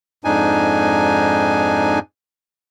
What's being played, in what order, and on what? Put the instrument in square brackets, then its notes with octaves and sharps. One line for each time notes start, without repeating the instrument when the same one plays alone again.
[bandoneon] F2 G#2 D4 D#4 G#5